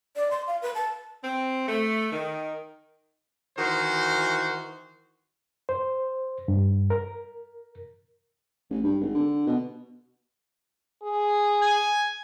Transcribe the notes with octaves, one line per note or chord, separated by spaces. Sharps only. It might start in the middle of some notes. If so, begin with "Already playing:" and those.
D5
C6
F5
B4
A5
C4
A3
D#3
D#3 E3 F#4 C5
C5
G2
A#4
A1
G2
G#1
D3
B2
G#4
G#5